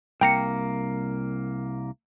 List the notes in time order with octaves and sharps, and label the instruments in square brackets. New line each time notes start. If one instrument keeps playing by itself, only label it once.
[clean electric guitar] C2 A#3 [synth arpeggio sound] G5 A#5 C#7